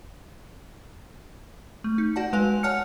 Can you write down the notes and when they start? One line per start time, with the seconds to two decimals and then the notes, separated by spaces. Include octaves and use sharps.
1.84 A3
1.98 D#4
2.16 F#4 D5 F#5 A5
2.33 G#3 B4 F5 G#5 F7
2.63 C#5 F#5 A5 F6 C#7